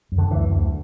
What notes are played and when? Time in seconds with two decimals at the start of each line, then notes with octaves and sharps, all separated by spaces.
0.12 F#2
0.18 D3
0.31 D2 E3
0.51 D2